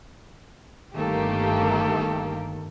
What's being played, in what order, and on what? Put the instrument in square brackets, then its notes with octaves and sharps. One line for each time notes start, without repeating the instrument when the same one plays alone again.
[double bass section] G1 [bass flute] D#3 [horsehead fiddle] A3 A4 [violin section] A#3 G4